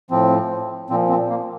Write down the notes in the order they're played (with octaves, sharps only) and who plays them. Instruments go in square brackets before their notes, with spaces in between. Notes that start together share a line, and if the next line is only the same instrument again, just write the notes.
[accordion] A2 F3 C4
A#2 F3 C4
C4
A#3